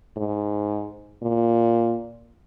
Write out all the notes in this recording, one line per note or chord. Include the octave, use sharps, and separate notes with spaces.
G#2
A#2